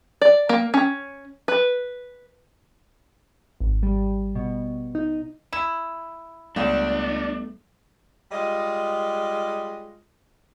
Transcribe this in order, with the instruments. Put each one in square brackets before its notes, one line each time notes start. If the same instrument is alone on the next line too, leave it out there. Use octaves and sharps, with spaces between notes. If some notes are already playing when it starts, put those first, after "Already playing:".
[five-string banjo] D5
A#3
C#4
B4
[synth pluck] G#1
G3
B2
D#4
[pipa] E4 [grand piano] E7
[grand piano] C#2 [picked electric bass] G3 A3 B3 [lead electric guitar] D4
[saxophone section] G3 G#3 F4 D#5